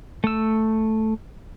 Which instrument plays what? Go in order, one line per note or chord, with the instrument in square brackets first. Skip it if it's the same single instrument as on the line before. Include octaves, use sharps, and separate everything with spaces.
[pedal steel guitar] A3 E6